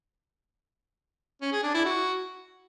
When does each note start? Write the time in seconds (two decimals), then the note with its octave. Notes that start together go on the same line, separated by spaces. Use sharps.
1.42 C#4
1.53 G#4
1.63 D4
1.74 E4
1.85 F#4